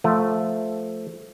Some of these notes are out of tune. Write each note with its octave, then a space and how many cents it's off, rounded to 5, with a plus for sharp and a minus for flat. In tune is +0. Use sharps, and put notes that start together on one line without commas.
F3 +0 A3 +0